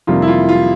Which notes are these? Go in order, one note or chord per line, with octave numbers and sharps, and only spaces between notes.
F2 C3 D#3 G3 A#3 F4
E4
F4
F4